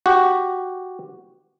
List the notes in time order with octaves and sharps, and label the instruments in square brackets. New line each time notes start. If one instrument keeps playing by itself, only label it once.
[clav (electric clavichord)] F#4 G4